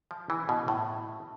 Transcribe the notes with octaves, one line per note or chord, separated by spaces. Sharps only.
F3
E3
B2
A2